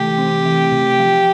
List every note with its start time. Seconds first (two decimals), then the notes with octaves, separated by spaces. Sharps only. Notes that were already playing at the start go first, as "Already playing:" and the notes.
Already playing: C3 E3 A3 G4
0.18 C4
0.46 E3
0.72 C3
0.99 F3